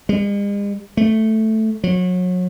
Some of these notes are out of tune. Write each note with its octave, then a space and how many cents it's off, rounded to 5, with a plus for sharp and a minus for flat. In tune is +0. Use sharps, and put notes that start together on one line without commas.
G#3 -45
A3 +0
F#3 -30